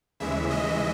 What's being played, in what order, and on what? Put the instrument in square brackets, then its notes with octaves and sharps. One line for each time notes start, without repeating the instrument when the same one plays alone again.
[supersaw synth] D#2 C#3 E3 G#3 E5
D#5